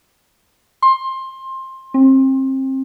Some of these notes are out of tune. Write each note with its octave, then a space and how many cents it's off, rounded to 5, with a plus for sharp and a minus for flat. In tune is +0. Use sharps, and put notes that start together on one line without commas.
C6 +20
C4 +30